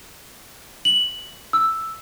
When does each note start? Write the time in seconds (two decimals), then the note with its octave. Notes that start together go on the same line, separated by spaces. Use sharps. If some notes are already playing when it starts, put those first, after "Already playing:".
0.85 F#7
1.53 E6